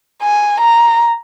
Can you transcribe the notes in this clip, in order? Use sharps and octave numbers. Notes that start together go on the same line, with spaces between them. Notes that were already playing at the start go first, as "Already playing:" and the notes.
G#5
A#5